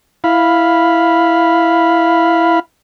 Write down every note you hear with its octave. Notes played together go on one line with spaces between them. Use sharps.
E4 F5 B5